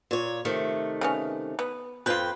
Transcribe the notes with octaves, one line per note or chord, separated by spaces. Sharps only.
A#2 C#5
C3 D#3 A3
C#3 B3 C#4
B3
F2 F4 B4 G5